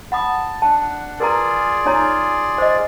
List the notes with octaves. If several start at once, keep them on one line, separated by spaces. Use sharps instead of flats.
F#5 A5 B5 D#6
D4 F#5 A5
F4 G#4 A#4 B4 D5 A#5
D#4 C#5 A#5
C5 D#5